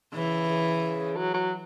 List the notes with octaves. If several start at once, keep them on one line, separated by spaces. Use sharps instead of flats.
C#3 E3
C#3
F#3
F#3